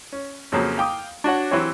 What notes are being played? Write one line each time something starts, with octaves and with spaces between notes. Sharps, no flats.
C#4
F2 C#3 F3 F#3 A#3
F5 G5 D6 D#6
D4 F#4 C#5 F#5
E3 F#3 C4 G4 C#5